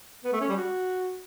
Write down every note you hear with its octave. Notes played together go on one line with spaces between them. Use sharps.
B3
A3
C#4
G3
F#4